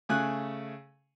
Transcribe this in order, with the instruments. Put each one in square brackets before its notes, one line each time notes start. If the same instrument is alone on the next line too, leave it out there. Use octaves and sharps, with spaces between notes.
[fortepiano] C#3 A3 G#5 F#6